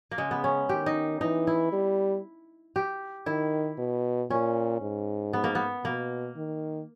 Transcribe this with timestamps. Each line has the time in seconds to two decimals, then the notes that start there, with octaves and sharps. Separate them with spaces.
0.11 A#3
0.18 C#3 G#3
0.31 B3
0.44 C#4
0.69 D#3 G4
0.86 D#4
1.21 E3 D#4
1.47 E4
1.72 G3
2.76 G4
3.26 D#3 E4
3.78 B2
4.30 A#2 C#4
4.81 G#2
5.33 B3
5.44 A#3
5.55 B3
5.84 B2 A#3
6.36 D#3